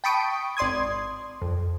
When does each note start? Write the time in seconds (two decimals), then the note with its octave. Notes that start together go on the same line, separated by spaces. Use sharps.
0.04 G5 A5 B5 C#6 D#6 D7
0.57 G#1 D5 C6 D#6 G#6
1.42 F2